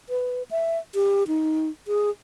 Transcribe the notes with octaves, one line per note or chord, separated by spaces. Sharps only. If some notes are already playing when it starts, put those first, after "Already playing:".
B4
E5
G4
D#4
G#4